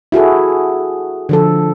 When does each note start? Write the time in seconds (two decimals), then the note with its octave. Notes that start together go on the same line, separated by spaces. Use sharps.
0.12 E4 F#4 G#4 A4
1.29 D3 F3 A4